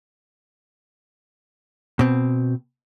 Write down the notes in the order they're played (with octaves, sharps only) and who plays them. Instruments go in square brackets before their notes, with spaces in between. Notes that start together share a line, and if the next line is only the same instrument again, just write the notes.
[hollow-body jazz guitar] B2 C4